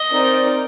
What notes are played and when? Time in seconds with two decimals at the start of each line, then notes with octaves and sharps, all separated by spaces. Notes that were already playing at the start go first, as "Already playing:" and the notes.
Already playing: D#5
0.12 C4 D#4 A#4 D5